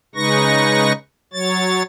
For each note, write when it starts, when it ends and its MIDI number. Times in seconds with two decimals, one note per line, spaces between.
0.15 0.93 49
0.15 0.93 56
0.15 0.93 63
0.15 0.93 71
0.15 0.93 85
0.15 0.93 94
1.33 1.83 54
1.33 1.83 73
1.33 1.83 93